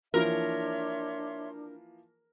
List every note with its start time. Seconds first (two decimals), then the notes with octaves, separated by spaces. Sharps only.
0.14 E3 F3 A#3 D4 A#4 C#5 E5 C6